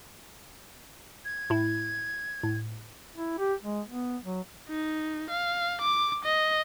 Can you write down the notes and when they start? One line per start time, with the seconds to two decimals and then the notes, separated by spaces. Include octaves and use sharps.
1.25 G#6
1.50 A2 E4
2.43 A2
3.16 E4
3.39 G4
3.63 G#3
3.87 B3
4.23 F#3
4.69 D#4
5.30 F5
5.81 D6
6.25 D#5